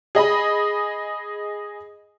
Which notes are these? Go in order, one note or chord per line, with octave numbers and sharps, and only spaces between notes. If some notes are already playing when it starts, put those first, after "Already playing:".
G#4 D#5 B5